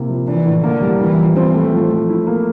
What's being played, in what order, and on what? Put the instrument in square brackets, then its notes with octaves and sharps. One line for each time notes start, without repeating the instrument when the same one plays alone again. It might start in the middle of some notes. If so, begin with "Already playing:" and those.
Already playing: [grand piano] C3 A#3 E4
F3
[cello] E3 [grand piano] D4
[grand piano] A2
[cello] D3 [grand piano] A#3
[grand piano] G3
[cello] E3 [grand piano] E4
[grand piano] F3
[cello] E3 [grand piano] C4
[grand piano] A3
F3
F3
E4
A#3